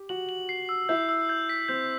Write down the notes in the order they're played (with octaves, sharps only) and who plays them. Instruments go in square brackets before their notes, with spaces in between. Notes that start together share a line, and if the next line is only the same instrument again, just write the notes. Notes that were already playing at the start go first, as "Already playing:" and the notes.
Already playing: [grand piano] G4
[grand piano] F#4 [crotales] F#7
[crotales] F#7
C7
E6
[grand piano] E4 [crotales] G6
[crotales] E6
G6
B6
[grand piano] C4 [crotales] G6